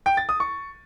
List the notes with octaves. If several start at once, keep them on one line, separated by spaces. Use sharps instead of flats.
G5
A6
D#6
C#6